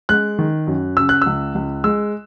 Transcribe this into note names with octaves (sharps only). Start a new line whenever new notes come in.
G#3 F#6
D#3
F#2
C#3 E6
F#6
C#2 E6
C#2
G#3 E6